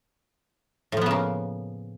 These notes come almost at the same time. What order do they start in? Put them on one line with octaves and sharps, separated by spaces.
A2 F3 B3 C#3 A#3